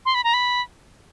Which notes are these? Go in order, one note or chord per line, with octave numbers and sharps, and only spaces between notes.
C6
B5
A#5
B5